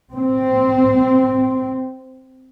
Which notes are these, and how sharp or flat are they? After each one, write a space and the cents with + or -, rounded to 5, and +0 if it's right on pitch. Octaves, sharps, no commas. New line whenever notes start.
C4 -10